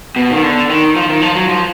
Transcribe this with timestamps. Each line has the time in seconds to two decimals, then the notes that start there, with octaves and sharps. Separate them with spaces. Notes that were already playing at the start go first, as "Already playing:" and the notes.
0.16 B2
0.31 D#3
0.43 D3
0.70 D#3
0.96 F3
1.09 D#3
1.22 F3
1.35 F#3
1.48 F3